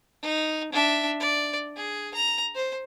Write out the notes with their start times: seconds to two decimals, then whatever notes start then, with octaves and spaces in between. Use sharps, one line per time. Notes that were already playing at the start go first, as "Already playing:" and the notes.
0.23 D#4
0.73 D4 E5
1.20 D5
1.77 G#4
2.14 A#5
2.55 C5